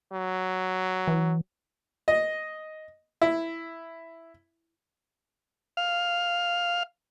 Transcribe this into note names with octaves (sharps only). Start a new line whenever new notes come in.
F#3
E3
D#5
E4
F5